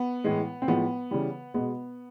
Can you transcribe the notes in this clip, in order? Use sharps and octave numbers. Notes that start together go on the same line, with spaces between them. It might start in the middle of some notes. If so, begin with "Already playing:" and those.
Already playing: B3
A2 E3 G#3
C4
A2 F3 G#3 B3
C#3 E3 G3
B2 G#3 B3